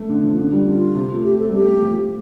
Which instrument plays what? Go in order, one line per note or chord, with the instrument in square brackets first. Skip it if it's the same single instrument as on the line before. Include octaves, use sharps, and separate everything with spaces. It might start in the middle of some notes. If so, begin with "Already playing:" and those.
Already playing: [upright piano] A3
D3
F3
D3
G3
[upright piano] D3 [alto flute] F4
[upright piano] C3
A3
[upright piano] A3 [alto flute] G4
[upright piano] C4 [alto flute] A4
[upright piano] G3
[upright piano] A3 [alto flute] G4
[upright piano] A3
F3